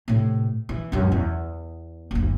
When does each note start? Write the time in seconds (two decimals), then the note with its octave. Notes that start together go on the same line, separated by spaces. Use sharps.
0.08 A2 C3
0.69 E3
0.92 C#2 F#2
1.12 E2
2.11 F#1 D2